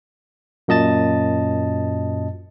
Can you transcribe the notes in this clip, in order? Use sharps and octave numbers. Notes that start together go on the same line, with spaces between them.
F#2 A#2 D#5 A5 A6